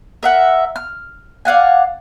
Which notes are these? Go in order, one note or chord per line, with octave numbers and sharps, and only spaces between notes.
A#4 E5 F#5
F6
D5 F5 F#5 G#5